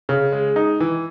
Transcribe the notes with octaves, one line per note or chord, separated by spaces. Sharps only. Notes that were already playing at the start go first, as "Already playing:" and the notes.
C#3
G#3
D#4
E3